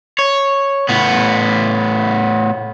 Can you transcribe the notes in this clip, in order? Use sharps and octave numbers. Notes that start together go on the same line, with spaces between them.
C#5
A2 B3